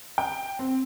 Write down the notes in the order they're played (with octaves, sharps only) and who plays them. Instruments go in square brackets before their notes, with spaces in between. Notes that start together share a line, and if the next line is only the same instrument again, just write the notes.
[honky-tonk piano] G5
C4